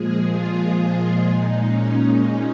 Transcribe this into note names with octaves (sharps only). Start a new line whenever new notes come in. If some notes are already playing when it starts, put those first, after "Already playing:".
Already playing: A#2 F3 G#3 G#4
F4
A#2 G#3 D#4
C#4
C#4